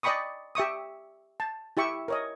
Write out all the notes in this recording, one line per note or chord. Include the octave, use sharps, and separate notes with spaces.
D5 D#5 G5 B5 C#6 D#6
G4 E5 C#6 D#6
A5
E4 G4 E5 C#6
A#4 C#5 D#5